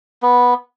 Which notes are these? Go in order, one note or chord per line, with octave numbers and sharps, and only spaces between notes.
B3